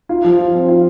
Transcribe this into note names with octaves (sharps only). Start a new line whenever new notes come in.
F4
F3
F3
C4
F4